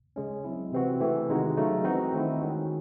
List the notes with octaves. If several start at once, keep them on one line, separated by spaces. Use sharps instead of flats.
C#3 G#3 C#4
F#3 C4 E4
C3 E3 C4 F#4
C#3 E3 A3
C3 D#3 G#3 D#4 F#4
C#3 F#3 A3 D#4
E3 C4 D#4 F#4
D#3 A3 C4 E4
D#3 G#3 C#4 F#4